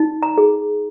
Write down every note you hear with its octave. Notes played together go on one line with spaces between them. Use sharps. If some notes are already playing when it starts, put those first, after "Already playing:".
Already playing: D#4
A#5
G#4